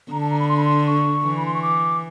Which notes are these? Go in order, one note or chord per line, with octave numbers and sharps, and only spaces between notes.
D3 A#5
A5
A#5
B5
C6
B5
C6
C#6
E3
B5
C6
C#6
D6